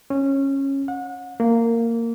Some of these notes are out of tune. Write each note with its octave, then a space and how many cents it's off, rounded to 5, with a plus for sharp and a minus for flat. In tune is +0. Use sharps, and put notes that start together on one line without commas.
C#4 -15
F#5 -30
A#3 -15